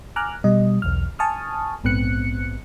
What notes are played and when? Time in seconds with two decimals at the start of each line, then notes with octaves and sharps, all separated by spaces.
0.16 G#5 A#5 D6 F6 F#6
0.44 B2 G3 D#5
0.82 B1 E2 F6
1.19 G#5 A5 C#6 D#6 F6
1.84 A#1 G#2 B3 C4 F#6 C#7